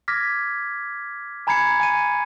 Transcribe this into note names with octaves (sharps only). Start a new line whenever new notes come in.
D6 F6 G#6 A#6 B6
G#5 A#5 B5 G#6 C7 C#7
G#5 C#7 D#7